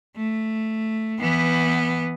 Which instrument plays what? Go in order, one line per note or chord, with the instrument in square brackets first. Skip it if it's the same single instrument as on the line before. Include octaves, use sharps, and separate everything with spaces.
[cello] A3
E3 B3